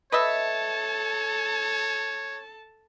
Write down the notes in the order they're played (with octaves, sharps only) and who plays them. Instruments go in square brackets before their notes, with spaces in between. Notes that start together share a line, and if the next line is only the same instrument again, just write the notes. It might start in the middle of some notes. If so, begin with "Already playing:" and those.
[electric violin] A4 A5 [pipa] B4 D#5 E5 [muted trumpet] C#5